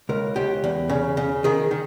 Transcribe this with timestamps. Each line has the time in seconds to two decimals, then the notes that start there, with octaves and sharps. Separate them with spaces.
0.09 C#2 A#4
0.36 C#2 G4
0.64 E2
0.89 C#3
1.17 C#3
1.44 D#3 G#4
1.71 D#3